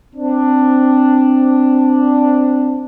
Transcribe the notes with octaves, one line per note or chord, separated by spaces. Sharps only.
C4 D4